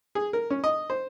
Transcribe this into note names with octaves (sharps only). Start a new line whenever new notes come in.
G#4
A#4
C#4
D#5
C5